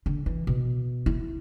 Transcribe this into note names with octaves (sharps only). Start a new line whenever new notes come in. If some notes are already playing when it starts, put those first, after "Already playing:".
D3
E3
B2
E4